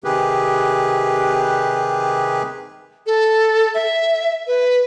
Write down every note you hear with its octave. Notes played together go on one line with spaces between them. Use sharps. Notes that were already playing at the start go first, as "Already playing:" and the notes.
C3 D#3 G4 G#4 B4
A4
E5
B4